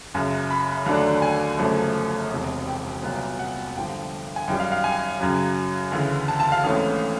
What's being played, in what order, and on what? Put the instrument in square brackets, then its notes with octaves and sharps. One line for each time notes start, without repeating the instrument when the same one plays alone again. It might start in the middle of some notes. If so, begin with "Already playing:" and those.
[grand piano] F#1 F#2 C#3
B5
D#2 D3 F#3 A3 D4
G#5
G1 F#2 C#3 F3 A3
E1 E2 C3 D#3
G5
C2 A#2 F#3 B3
F#5
G2 D3 F3 G5
G#5
F#2 D#3 G3 G5
F5
F5
G#5
F#2 C#3 F#3
D2 C#3 E3
A5
A5
F5
G#1 G#2 E3 A3 C#4 F5